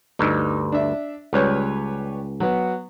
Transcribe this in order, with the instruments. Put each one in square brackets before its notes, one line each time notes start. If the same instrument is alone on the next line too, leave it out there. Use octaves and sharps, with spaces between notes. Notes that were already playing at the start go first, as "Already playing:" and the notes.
[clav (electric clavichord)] D2 G2 [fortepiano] D#4 E6
[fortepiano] D4 E5
[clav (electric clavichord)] C#2 [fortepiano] G3 B4 C#5
[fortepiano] F#3 B3